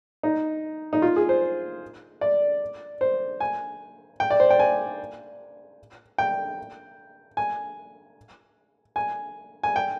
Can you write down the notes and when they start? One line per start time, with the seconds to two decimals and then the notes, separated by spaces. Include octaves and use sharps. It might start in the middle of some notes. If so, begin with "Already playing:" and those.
0.23 D#4
0.93 D#4
1.02 F4
1.16 G#4
1.29 C5
2.21 D5
3.01 C5
3.40 G#5
4.20 G5
4.30 D5
4.40 C5
4.50 G5
4.59 G#5
6.18 G5
7.37 G#5
8.96 G#5
9.63 G#5
9.76 G5